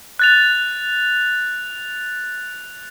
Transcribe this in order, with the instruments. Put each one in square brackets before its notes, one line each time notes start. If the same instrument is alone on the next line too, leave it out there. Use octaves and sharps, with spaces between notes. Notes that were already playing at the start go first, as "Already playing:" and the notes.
[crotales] F#6 A6 F7